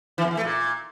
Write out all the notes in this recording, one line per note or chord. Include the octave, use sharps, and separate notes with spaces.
E3
E2
E3
A3
A#2